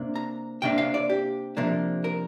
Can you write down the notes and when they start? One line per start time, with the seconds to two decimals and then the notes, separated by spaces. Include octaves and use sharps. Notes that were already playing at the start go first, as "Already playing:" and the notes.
Already playing: C3 A#3 D4
0.16 A#5
0.62 C3 A#3 D4 G5
0.78 F5
0.94 D5
1.10 G4
1.57 C3 F3 A#3 D4
2.04 A#4